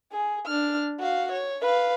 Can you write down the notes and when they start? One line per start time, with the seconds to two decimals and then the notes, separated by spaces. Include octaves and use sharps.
0.12 G#4
0.46 D4 F6
1.00 F#4 F5
1.32 C#5
1.62 B4 F5